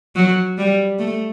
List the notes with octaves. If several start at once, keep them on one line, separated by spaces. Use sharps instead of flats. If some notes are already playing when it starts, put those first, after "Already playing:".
F#3
G3
A3